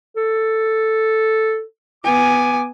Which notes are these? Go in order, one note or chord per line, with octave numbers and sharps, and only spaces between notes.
A4
B3 G#5 D6